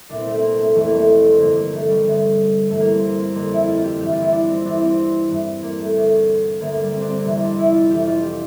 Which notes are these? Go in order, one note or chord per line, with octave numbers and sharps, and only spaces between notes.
C2 A#2 D4
C4
A3
C4
A#3
A3
F2 E3 A3
A#3
A3
C4
G2 D3 A#3
A#3
A3
G3
D2 D3
G2 E3 A3
A#3
C4
A#3
C4
F2 D3 A#3
E4
F4
F4
G4
G2 E3 G4
F4
E4
D4
C4
E2 E3 D4
C4
G2 E3
A#3
A3
D2 D3
D2 D3 A#3
A#3
G3
C4
D4
C4
A#3
F2 C3 E3 C4
D4
E4
F4
F2 E3 G4
F4
G4